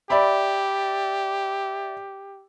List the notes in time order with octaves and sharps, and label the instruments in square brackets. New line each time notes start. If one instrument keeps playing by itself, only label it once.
[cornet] G4 [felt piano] D5 E5 B5